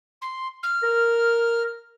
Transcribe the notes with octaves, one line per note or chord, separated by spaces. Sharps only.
C6
F6
A#4